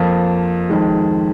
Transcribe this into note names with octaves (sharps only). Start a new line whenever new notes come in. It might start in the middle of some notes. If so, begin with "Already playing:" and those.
Already playing: F2 F3 A#3
F2 D#3 G#3